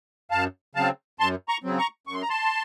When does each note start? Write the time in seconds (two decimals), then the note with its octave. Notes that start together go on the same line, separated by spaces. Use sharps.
0.31 F#2 F5 A5
0.75 C#3 F#3 C4 F5 A5
1.20 F#2 A5 C6
1.48 A#5 C#6
1.64 C#3 F#3 C4
1.78 A#5 C#6
2.07 F#2 C#6
2.15 C6
2.22 A#5
2.29 A5 C6